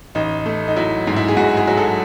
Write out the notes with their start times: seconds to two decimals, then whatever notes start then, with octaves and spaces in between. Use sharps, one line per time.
0.15 A1 D#4
0.46 A3
0.68 D#4
0.76 F#3 E4
1.07 G#2
1.16 E4
1.28 G#4
1.37 G#2 F#4
1.57 G#4
1.67 F#3
1.77 A4